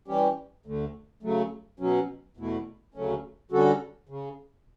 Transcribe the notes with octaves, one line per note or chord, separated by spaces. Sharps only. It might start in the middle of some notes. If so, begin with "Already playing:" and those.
E3 G3 C#4 G4
D2 D3 A3
C#3 F#3 A3
B2 F#3 C#4
E2 B2 A3 E4
D2 C#3 F#3 A3 C#4
D3 G3 C#4 F#4 A4
C#3